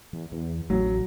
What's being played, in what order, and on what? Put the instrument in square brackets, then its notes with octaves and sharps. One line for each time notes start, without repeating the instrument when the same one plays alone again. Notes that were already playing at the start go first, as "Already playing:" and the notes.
[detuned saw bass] E2
E2
[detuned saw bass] A1 [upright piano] F#3